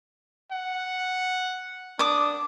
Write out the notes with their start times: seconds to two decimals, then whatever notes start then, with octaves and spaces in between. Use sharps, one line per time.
0.52 F#5
1.99 D4 D6 D#6